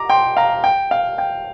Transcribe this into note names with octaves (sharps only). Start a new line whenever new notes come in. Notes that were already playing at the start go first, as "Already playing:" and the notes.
Already playing: A#5 D6
G5 C6
F5 A#5
G5
F5
G5